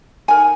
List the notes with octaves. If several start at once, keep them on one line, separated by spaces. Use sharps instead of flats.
D#4 A#4 G#5